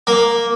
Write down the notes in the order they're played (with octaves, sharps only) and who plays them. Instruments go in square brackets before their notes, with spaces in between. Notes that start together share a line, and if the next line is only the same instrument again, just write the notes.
[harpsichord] A#3